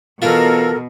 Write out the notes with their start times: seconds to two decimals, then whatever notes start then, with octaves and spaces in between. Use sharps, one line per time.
0.22 B2 E3 E4 F4 A4 A#4